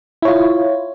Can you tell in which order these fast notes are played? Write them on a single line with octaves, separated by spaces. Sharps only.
E4 C#5 F4